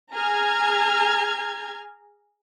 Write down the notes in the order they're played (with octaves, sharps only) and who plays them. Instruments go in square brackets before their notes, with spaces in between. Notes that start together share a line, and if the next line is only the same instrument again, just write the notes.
[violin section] G#4 A#5 F6 G#6